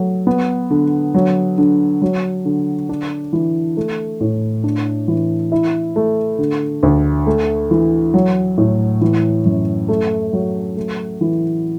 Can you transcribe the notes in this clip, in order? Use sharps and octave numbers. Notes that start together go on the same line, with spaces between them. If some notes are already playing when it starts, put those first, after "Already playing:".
Already playing: F#3 A3
B3
D3
F#3
D3
F#3
D3
D4
E3
A3
A2
D4
E3
E4
A3
D3
D2
A3
E3
F#3
A2
E3
F#2
A3
F#3
A3
E3